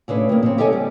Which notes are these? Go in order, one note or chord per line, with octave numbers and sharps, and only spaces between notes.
A2 C#3 D4 B4
F2 A#3
C#3 C4
G4 A4 C#5 D#5 F#5 G#5
G3